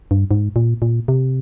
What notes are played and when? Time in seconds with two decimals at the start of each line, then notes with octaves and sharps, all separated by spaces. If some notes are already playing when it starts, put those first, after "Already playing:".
0.11 G2
0.31 G#2
0.56 A#2
0.82 A#2
1.08 C3